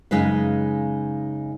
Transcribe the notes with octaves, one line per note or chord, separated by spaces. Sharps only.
F#2 C#3 G#3 D#4 B4 F5